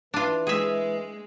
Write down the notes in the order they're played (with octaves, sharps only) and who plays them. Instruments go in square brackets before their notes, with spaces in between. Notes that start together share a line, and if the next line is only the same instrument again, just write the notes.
[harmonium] E3 [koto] D4 F4
[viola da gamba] G#3 [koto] G#4 E5